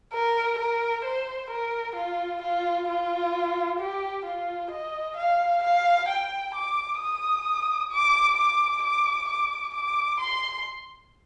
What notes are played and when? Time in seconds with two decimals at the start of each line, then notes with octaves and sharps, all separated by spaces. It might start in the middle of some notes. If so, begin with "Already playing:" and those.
0.13 A#4
0.59 A#4
1.05 C5
1.51 A#4
1.96 F4
2.42 F4
2.89 F4
3.80 G4
4.25 F4
4.71 D#5
5.17 F5
5.64 F5
6.09 G5
6.55 D6
7.00 D#6
7.92 D6
8.37 D6
8.83 D6
9.29 D6
9.75 D6
10.21 C6